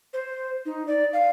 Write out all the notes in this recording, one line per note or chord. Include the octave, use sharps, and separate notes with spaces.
C5
D#4
D5
F5